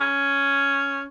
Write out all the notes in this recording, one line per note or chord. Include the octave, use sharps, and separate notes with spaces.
C#4